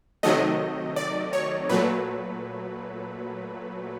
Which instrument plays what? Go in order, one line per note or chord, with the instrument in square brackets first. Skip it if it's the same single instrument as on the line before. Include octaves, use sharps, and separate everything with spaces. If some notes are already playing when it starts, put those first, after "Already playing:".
[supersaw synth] C3 D#3 F#3 A3 D#5
D5
C#5
A#2 F#3 A3 B4